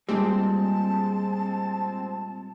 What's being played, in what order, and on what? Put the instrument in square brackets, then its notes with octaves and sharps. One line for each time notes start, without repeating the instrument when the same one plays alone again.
[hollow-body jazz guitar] A#2 G3 [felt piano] G#3 [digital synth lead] C4 [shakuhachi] A5